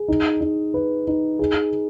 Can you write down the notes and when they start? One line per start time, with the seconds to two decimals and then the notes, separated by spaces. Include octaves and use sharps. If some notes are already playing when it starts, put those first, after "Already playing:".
Already playing: G#4
0.08 D#4
0.41 D#4
0.74 B4
1.07 D#4
1.39 G#4